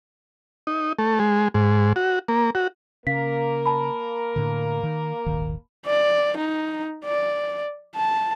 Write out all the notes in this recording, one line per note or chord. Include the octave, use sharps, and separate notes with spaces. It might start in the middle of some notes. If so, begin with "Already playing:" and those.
D#4
A3
G#3
G#2
F#4
A#3
F#4
C#3 A#3 C#4 A#4 F5 B6
A5 B5
A2 D3
D#3
D#1 G#1 D#3
D5
D#4
D5
A5